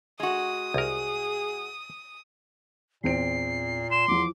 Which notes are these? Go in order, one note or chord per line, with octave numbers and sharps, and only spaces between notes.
G#3 F#4 D#6
C2 G#4 A#4
E2 A#2 C4 C7 D7
C6 E7
E2 E3 F3 D6